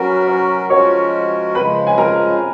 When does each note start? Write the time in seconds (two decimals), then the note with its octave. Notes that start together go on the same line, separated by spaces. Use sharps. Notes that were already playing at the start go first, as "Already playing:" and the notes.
Already playing: F#3 C#4 F#4 A#4 B4
0.27 C#5 C#6
0.70 F3 G#3 C#4 F#4 A#4 C#5 C#6
1.54 C#3 F3 G#3 B4 B5
1.87 G#5
1.98 A#4 A#5